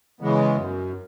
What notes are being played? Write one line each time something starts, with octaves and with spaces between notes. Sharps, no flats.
C#3 E3 G#3 B3
F#2